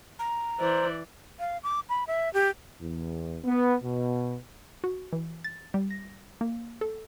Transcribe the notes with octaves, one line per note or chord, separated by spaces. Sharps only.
A#5
E3 C5 D5
F5
D6
B5
E5
G4
E2
B3
B2
F#4
E3
A6
G3
A#6
A#3
A4